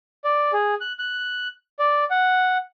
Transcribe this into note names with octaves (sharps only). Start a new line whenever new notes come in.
D5
G#4
F#6
F#6
D5
F#5